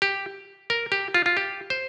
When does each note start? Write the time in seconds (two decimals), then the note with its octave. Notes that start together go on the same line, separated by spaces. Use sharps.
0.02 G4
0.70 A#4
0.92 G4
1.14 F4
1.26 F4
1.37 G4
1.70 C5